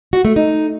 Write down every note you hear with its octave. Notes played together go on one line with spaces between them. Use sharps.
F#4
A3
D#4